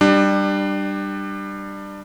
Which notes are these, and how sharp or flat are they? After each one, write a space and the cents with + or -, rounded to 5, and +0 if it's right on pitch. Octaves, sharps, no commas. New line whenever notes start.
G3 +0 D4 +25